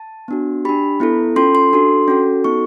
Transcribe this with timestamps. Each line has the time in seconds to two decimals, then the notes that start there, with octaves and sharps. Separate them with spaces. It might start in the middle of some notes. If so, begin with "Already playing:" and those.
Already playing: A5
0.28 B3 D4 F#4
0.65 D4 G4 B5
1.00 B3 E4 A4
1.36 C#4 F4 A4 C6
1.55 C6
1.73 D4 F#4 A4
2.08 C#4 F#4 A4
2.44 B3 D#4 F#4 A4 C#6